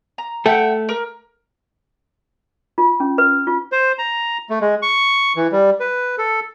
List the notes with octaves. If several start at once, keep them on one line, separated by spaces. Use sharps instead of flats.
A#5
A3 A4 E5 F#5 G5
A#4
F4
C#4
B4
F4
C5
A#5
A3
G#3
C#6
E3
G3
B4
A4